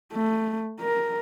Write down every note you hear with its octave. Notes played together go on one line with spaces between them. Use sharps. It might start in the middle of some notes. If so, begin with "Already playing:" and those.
A3
A#4